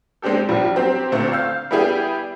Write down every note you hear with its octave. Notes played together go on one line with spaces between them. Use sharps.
G#3 C4 D4 G4 A4
A#1 F3 G3
F#3 C4 G4 C5
A#2 D3 A3 C4
F5 E6 G6
G3 B3 E4 G4 G#4